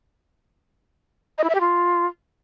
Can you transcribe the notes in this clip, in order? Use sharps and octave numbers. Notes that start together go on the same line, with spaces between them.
D#5
E4
E5
G4
F4